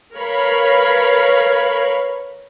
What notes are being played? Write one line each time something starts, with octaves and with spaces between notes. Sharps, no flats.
A#4 B4 C#5 F5 B5